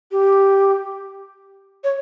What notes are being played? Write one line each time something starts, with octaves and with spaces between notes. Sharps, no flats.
G4
C#5